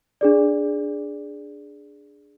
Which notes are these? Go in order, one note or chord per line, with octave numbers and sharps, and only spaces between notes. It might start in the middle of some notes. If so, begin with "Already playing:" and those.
D4 G#4 D5